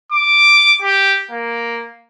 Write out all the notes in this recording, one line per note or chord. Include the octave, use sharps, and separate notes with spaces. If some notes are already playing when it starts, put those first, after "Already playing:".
D6
G4
A#3